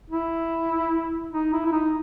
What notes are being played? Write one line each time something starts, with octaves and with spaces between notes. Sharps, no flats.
E4
D#4
E4
E4
D#4